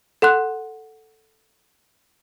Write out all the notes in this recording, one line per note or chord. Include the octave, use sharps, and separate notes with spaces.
A4 F#5 C6 F#6